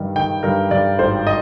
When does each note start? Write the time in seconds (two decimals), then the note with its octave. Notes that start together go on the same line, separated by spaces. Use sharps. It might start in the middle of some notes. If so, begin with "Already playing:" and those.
Already playing: G2 D#3 G3
0.16 D#3 G5
0.43 G2 A#4
0.71 G2 D5
0.99 G#1 C5
1.27 D#5